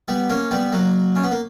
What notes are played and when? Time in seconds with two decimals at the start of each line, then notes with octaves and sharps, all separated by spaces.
0.08 G3 B3
0.29 A#3 C#4
0.51 G3 B3
0.72 F#3 A#3
1.15 C#4
1.23 B3
1.31 A#3